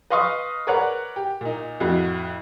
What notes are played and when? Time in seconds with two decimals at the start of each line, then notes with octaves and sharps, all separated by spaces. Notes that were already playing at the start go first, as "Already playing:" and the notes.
0.10 B4 D#5 F5 C6 C#6 D#6
0.67 A#4 B4 C#5 D5 F#5
1.16 G4
1.41 A#2 D#4
1.80 F2 A2 F#4